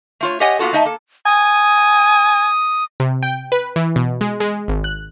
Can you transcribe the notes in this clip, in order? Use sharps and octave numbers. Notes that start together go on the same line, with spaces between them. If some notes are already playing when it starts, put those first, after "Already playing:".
A3 F4 C#5
G4 C#5 D#5 F#5 G#5
A#3 B3 F4 F#4 A4
A3 D#4 D#5 E5 A5
A#3 A4
G#5 D#6
C3
G5
B4
E3
B2
G#3
G#3
G#1
F#6